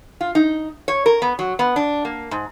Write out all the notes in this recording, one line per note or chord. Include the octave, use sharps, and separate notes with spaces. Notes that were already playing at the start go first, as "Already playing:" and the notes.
F4
D#4
C#5
A#4
B3
F#3
B3
D4
A#3
G#2